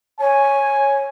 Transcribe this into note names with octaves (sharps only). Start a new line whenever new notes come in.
C#5 G#5